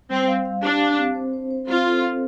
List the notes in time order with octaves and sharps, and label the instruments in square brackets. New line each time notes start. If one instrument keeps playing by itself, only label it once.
[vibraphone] G3 [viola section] C4
[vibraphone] F5
F5
[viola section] D4 [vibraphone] G4
[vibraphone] F5
C4
C5
C5
C5
[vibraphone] C4 [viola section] F4
[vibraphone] A4
C4